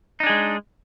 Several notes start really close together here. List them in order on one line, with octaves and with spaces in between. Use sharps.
D#4 D4 G#4 G#3